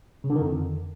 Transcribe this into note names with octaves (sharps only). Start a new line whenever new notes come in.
C#3
D3
D#3
F2